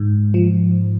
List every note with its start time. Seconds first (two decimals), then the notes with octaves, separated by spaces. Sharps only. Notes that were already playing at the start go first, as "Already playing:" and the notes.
Already playing: G#2
0.34 F3